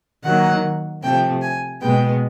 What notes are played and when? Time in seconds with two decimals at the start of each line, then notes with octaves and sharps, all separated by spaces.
0.24 D#3 F#3 A#3 F#5
1.03 C3 F3 A3 G5
1.42 G#5
1.82 B2 G#3 B3 G5